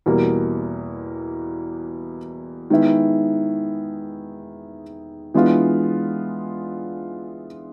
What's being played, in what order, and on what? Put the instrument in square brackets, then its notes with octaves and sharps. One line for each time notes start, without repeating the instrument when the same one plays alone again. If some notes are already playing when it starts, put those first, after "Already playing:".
[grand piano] E2 B2 G3 A#3
D#3 G#3 B3 E4
E3 G#3 B3 D4 F4